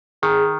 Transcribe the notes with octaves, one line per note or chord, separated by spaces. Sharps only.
D#3 G#4